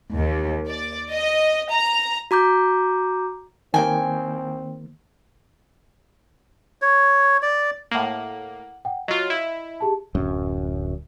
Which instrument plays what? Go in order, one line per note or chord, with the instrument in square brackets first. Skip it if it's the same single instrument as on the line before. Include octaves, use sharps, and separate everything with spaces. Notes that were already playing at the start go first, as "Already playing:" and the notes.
[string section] D#2
D5
D#5
A#5
[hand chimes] F#4 A#5 D6 G6
[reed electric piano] D#3 A#3 [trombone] C4 [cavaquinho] G5 G#5
[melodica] C#5
D5
[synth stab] A2 A#3 [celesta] F#5 F#7
[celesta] F#5 G5
[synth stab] F#3 F4 [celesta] D#5
[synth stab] E4
[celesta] G4 G#4 A5
[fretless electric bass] D1 F#2